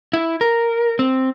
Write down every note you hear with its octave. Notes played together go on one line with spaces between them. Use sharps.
E4
A#4
C4